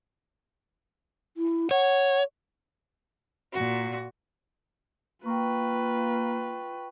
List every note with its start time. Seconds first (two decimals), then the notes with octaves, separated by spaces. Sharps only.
1.37 E4
1.71 C#5 F#5
3.52 A#2 F#4
5.26 A#3 F4 B4 G5 C#6